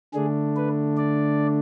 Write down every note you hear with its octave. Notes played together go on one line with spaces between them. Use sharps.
D3 A3 D4 G#4
B4
D5